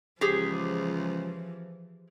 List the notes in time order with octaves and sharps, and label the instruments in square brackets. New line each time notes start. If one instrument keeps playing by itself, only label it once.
[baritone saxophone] C#2 [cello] E3 F3 [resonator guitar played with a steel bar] G4 G#4 C5